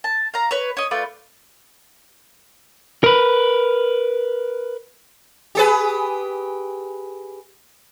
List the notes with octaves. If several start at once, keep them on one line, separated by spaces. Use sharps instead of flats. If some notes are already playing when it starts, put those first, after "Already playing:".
A5
F5 A#5
B4 C#5
C#5 D#5
A3 F4 B4 D5
A#4 B4
G4 G#4 B4